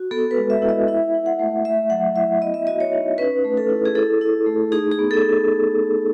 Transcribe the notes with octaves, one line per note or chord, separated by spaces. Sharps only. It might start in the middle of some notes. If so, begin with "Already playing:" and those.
Already playing: F#4
B3 A4
B4
G#3
E5
E4
D#5
E4 E5
E4
F#5
A3
A3 E5
F#3 F#5
E4 E5
B3 D#5
E5
F#4 D#5
C#5
D#4
C#4 B4
A3
A4
E4
G#4
E4 A4
E4
A3
D#4 G#4
G#4
B3
A4